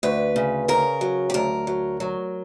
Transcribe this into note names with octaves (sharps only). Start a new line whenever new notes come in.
D2 B4
C#3
C#3 A#4
F#3
G4
D2 A#4
F#3
F#3